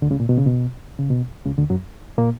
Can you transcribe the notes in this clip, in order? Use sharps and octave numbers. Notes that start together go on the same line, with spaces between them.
D2 D3
C#2 C#3
A#2
B2
C#3
B2
C#3
B2
C#2 C#3
D2 D3
F#2 F#3
A#2 A#3